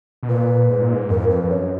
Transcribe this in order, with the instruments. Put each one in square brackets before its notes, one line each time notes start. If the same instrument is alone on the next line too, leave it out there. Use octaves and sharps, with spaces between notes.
[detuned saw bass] B2
[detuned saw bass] A#2 [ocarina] B4
[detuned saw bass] G#2
A#2
G#2
[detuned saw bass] F2 [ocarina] A#4
[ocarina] B4
[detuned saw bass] F2
[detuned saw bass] F#2 [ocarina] C#5